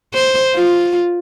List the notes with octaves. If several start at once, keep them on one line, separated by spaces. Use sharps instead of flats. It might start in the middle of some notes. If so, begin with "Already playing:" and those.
C5
F4